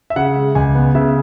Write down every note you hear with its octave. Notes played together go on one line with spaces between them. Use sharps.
E5
C#3 F#5
G#3
C#2 G#5
B3
C#3 E5